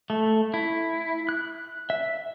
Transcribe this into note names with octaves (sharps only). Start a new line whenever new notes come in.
A3
E4
F#6
E5